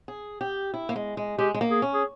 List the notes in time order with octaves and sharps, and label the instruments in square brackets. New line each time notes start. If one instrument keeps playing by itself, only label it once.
[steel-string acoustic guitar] G#4
G4
E4
A#3
G#3
G#3
[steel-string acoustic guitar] G#3 [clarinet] G4
[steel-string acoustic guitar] G#3
A#3
[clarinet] G#4
[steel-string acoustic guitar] C#4
[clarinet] G#4